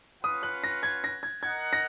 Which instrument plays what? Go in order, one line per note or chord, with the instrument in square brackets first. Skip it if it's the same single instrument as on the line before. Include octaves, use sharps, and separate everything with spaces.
[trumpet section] C#4 F4 B4 F#5 [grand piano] D#6
[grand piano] F#6
A#6
G#6
A#6
G#6
[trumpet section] D#4 A#4 D#5 F#5 [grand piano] G#6
[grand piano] A#6